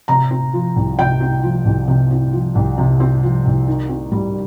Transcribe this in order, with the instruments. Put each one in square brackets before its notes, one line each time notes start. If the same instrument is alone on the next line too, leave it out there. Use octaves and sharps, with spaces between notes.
[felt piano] C3 A#5
C4
F3
C2
C3 G5
C4
F3
C2
C3
C4
F3
C2
C3
C4
F3
C2
D#3
C4
G3